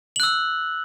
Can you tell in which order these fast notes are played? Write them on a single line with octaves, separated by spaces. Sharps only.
F#7 F#6 E6